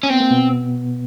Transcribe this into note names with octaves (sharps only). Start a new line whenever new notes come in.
C#4
B3 C4
A#3
B2 B3